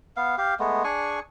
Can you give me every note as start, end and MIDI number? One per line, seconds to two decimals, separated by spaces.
0.17 0.36 59
0.17 0.36 77
0.38 0.54 67
0.38 0.54 77
0.60 0.83 56
0.60 0.83 57
0.60 0.83 59
0.84 1.20 62
0.84 1.20 68
0.84 1.20 80
0.84 1.20 85